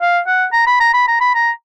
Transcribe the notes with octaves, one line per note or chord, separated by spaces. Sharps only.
F5
F#5
A#5
B5
A#5
B5
A#5
B5
A#5